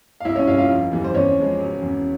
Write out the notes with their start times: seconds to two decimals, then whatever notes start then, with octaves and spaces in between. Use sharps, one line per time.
0.20 F5
0.25 C2 E4 E5
0.36 C#4 C#5
0.47 A#2 G3 F4 F5
0.58 F4 F5
0.70 F1
0.92 E2 E3 G3
1.04 C5
1.14 E2 C#4 C#5
1.37 C#3 F3 G#3
1.59 E1
1.82 E2 C#3